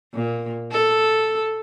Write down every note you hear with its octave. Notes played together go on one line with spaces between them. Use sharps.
A#2
A4